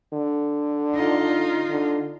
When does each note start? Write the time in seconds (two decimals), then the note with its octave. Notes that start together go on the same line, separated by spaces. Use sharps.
0.13 D3
0.94 D#4 F4
1.69 D3